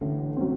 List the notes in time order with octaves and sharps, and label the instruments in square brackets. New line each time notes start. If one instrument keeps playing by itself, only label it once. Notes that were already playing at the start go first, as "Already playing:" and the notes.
[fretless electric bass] A1 A2 [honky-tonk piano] D3
[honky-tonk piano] F#3 C4